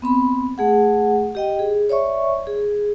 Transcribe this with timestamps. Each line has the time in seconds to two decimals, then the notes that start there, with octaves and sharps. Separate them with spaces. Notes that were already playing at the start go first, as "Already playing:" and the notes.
0.02 B3 C4 B5
0.58 A3 G#4 F#5
1.35 G4 D#5 G5
1.59 G#4
1.89 C#5 D5 E5 C#6
2.47 G#4